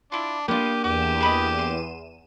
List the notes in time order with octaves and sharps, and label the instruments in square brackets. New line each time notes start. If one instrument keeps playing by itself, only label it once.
[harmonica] D4 [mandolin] E4 F4
[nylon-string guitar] A#3 D4 [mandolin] B3 F4 [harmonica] G4 [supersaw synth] D#7
[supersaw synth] E2 D#7 E7 [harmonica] G4 [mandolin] D6
[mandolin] G#4 B4 D#5
C6